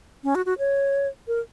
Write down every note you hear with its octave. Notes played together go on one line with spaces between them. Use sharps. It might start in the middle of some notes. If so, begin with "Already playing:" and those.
C#4
F#4
F#4
C#5
A#4